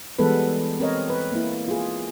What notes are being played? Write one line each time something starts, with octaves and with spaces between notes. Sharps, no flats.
E3 G3 G#3 B3 A4 B4
C4 A#4 C#5 D#5
B4
A#3 E4
F4 G#4